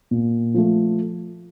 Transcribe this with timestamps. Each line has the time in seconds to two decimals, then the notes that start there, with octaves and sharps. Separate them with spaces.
0.11 A#2
0.54 F3 A3